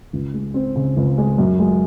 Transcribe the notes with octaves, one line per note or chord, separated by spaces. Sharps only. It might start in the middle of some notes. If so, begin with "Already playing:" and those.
C#2
G#3
C4
C#3
C#2
G#3
F#2
G#3